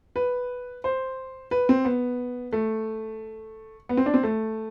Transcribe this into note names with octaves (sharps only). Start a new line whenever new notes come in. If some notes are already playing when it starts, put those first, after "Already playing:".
B4
C5
B4
C4
B3
A3
B3
C4
D4
C4
A3